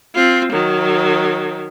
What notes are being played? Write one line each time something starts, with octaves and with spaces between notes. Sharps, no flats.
C4 F4
D#3 F#3